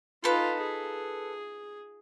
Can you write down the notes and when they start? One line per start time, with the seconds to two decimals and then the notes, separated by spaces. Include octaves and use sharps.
0.24 D#4 F4 A4 B4
0.61 G#4